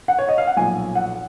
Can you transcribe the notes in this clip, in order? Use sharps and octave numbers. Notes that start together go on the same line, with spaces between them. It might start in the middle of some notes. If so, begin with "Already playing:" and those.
F#5
C#5
D#5
F5
F#5
B1 A#2 F3 G#5
F#5